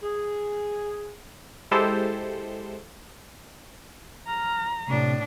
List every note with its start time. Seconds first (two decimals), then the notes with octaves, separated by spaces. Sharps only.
0.03 G#4
1.71 G#3 E4 G4 A4 C5
4.27 A#5 F6
4.87 A2 C3 D4